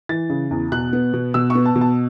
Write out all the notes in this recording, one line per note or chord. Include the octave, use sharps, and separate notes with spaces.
E3 A6
C#3
E2
B2 F#6
B3
B2
B2 E6
C#6
B3
A5
B2
A5